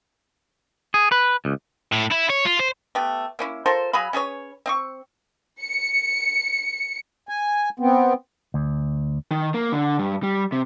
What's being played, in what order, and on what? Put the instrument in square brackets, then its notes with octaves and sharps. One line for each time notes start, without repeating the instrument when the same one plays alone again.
[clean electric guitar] G#4
B4
C#2
[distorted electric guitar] A2
E4
C#5
F4
C5
[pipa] A3 B3 G4
A#3 C#4 E4
F4 A4 A#4 C5
F#3 G#4 F5 B5
C#4 G#4 B4 C#5
C4 E5 C#6
[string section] C#7
[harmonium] G#5
B3 C4
[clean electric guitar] D2
[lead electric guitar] D#3
A#3
D3
G2
G3
C3